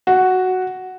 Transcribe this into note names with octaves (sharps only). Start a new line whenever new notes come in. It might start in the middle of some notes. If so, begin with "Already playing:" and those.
F#4